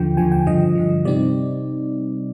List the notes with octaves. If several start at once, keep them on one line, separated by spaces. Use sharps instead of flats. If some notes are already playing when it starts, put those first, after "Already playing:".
Already playing: D#2 D3 F3 G5
D#2 D3 F3 G#5
G5
G2 D3 F3 D#5
G2 D3 F3
C3 G3 C4 D#4 D5